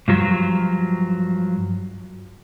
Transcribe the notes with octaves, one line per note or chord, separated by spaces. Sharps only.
G2 F3 F#3